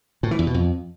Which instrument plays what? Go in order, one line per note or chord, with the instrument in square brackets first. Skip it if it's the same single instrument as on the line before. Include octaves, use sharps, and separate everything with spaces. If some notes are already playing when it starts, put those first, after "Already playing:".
[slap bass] A2
E3
E2
B2
F2